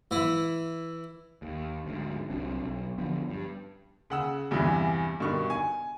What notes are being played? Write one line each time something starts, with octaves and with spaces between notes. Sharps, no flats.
E3 E4
D#2
D2 G#2
C2 F#3 C4 D4
B1
D3 F3 B3
G2
C#3 F#5 E6
E2 G2 C3 E3
G2 B2 D#3 C#6
G#5